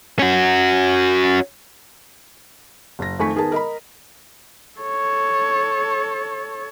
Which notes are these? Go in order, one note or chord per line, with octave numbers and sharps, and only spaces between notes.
C#4 F#4
F#1 A#6
F2 D#3 A3 G#5 C#6 B6
D#3 B3 G#4 A#4 A5
A#4 D#5 A#5 B5
A4 C#5